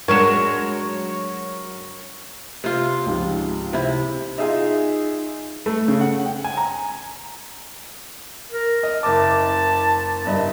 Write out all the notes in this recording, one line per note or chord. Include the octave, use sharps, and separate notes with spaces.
F#3 G#3 D4 A#4 C#5 E7
C3 F4
C#2 G#2 F3
C3 E4
D#4 F4 G#4 E5
A3
C#3
F#5
G5
G#5
A#5
A#4
D#5
F#1 A5 D6
F#1 G2 D#5